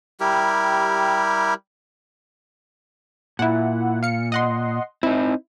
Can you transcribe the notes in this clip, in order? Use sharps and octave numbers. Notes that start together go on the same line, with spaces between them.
G3 E4 G4 A#4
A#2 E4 F#5
F5 C#7
D#5 F#5 C6
C4 D#4 E4